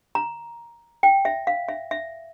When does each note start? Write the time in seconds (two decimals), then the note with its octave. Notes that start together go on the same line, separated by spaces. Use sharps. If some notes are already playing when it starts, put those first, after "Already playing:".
0.15 A#5
1.03 G5
1.25 E5
1.47 F5
1.68 E5
1.91 E5